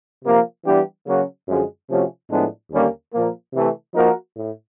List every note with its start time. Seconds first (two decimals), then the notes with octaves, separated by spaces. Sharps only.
0.25 C3 F3 A#3
0.66 E3 G3 B3 D4 G4
1.07 C#3 F#3 A#3 C#4 F#4
1.48 F#2 D3 F3 G#3
1.90 C3 F3 A3 C#4 F#4
2.30 A2 F3 G#3 B3 D4
2.71 D#2 D3 G3 A#3 C#4
3.14 A#2 F3 A#3
3.54 C3 E3 A3
3.95 F3 A#3 D#4 F#4 A#4
4.36 A2